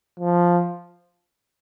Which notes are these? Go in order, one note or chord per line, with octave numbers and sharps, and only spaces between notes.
F3